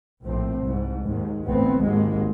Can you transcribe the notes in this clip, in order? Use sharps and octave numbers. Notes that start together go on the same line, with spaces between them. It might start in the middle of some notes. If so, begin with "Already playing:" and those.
A#1 A2 C4
C2 G#2
D#2 G#2 G#3
A1 D2 B3 C4
G#1 D#2 G#2 G#3